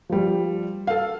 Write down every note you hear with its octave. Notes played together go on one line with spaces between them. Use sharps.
F3 G3
A4 F5